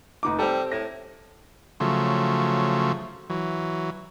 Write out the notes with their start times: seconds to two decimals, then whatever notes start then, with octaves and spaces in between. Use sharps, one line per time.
0.23 F1 D#4 D6
0.39 G3 C4 A4
0.72 A2 A#6
1.80 C#3 F3 F#3 A3
3.30 E3 F#3